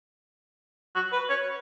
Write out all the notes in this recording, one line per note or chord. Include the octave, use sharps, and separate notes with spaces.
F#4
B4
C#5